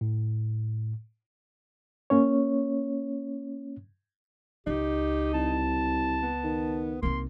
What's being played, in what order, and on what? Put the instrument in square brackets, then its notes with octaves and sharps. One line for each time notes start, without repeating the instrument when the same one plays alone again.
[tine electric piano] A2
[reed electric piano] A#3 C#4 C#5
[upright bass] C#2 [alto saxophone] D#4 [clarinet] G4
[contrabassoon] C2 [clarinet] A5
[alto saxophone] B3
[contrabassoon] D#3
[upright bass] C2 D#4 [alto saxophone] A#3 [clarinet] C6